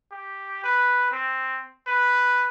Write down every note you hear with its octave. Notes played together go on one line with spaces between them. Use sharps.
G4
B4
C4
B4